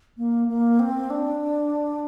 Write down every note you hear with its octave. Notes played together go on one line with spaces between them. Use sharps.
A#3
A#3
C4
D4